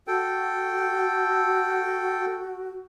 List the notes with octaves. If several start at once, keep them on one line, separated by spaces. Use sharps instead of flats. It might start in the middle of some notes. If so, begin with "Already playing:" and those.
F#4 A4 G5